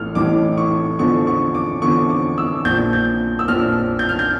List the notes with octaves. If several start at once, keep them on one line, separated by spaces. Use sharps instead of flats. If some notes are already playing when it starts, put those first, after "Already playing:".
Already playing: A1 A2 E3 F6
A1 A2 E3 D6
C#6
E2 D3 F3 C#6
C#6
D6
E2 D3 F3 C#6
D6
E6
A#1 A#2 F3 G6
G6
E6
A#1 A#2 F3 F6
G6
F6
G6